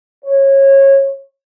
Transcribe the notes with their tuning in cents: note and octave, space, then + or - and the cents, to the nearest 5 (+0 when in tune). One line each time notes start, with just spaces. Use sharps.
C#5 -20